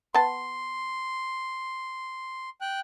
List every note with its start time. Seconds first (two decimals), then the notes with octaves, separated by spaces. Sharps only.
0.14 B3 A5 C6
2.61 G5 F#6